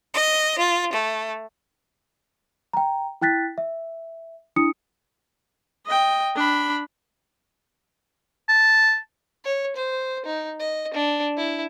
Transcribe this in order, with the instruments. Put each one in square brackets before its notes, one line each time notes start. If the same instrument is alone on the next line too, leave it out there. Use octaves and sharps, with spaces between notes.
[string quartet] D#5
F4
A3
[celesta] G5 A#5
E4 G5 F#6 A6 B6
E5
D4 E4 D#6 C#7
[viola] D#5 G5
D4 B5
[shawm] A5
[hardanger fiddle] C#5
C5
D#4
D#5
D4
E4